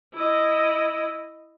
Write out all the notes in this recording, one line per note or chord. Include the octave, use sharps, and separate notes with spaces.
E4 D#5